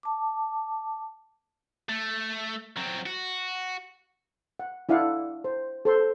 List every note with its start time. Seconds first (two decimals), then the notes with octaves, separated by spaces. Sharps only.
0.03 A5 D6
1.89 A3
2.77 F#3 C4
3.06 F#4
4.59 F#5
4.89 D4 E4 D5 F5 F#5
5.44 C5
5.85 A4 C5 C6